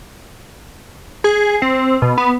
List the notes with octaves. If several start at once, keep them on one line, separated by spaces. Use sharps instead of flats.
G#4
C4
B2
B3